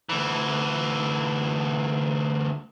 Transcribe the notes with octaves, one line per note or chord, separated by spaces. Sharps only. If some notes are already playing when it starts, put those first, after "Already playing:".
D2 E3